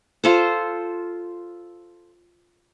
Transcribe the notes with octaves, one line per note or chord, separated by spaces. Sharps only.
F4 A4 C5